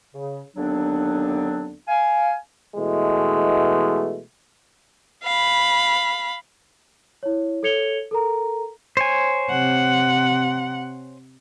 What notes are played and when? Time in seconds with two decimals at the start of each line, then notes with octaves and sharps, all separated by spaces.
0.13 C#3
0.55 D#2 D3 F#3 B3 C4 D4
1.88 F5 G#5
2.76 B2 E3 G#3 A3
5.24 F5 B5
7.23 E4 C#5
7.63 A4 C#5 G#6 C#7 F7 G7
8.11 A4 A#4 A#5
8.97 C5 C#5 G#5
9.50 C3 F#5